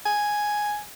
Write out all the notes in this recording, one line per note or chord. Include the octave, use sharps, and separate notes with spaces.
G#5